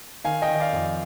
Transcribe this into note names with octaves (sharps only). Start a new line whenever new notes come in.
D#3 F5 G#5
D#5 G5
D#3
D#5
D5 F5
F2